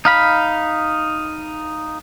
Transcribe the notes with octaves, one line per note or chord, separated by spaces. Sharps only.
D#4 F5 B5